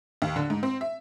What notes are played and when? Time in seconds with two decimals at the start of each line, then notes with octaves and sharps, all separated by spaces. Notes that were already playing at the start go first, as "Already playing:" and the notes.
0.22 D#2
0.36 D3
0.50 G#2
0.63 C4
0.81 E5